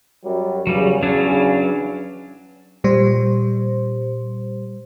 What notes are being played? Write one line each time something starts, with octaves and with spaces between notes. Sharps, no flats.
F#2 F#3 G3
E2 C#3 F#3 G3
F#3 C#4 D4
A#2 G3 C5